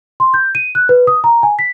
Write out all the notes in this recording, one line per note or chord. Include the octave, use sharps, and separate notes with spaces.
C6
G6
D#7
F#6
B4
D#6
A#5
G#5
B6